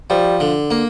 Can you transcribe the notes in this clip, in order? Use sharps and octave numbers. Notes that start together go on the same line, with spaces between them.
F3 G3
D3
A#3